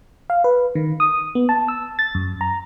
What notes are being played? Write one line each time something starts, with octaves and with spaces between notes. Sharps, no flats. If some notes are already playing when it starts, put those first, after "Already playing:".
F5
B4
D#3
D#6
B3
A5
E6
A6
F#2
A#5